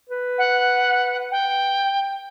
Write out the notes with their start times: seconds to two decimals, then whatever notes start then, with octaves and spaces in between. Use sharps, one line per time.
0.10 B4
0.38 F#5
1.31 G5